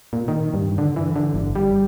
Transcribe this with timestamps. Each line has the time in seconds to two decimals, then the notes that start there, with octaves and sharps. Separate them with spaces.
0.13 A#2
0.28 D#3
0.54 G2
0.78 D3
0.96 E3
1.16 D3
1.34 G1
1.55 G3